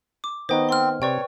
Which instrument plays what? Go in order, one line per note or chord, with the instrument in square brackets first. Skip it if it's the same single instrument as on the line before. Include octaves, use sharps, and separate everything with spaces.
[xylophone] D6
[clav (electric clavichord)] D#3 B3 D#4 [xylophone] C5 G5 [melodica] D#5
[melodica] C4 [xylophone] C6 F6
[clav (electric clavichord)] C3 [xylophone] B4 D5 G5 [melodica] C#5